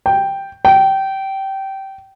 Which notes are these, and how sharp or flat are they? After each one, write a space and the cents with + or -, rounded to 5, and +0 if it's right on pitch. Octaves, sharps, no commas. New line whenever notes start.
G5 +0
G5 -20